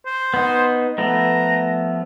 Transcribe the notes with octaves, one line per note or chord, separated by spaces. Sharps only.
C5
B3 D#4
F3 A3 B3 A#5